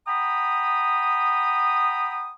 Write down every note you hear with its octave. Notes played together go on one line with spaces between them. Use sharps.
F#5 G5 A#5 B5 D#6